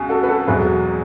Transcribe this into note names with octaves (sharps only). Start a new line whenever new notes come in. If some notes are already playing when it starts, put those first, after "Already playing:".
Already playing: C#2 B2 G#4
F#4 A4
B4
F#4 A4
E1 E2 B2 F#3 G#4 B4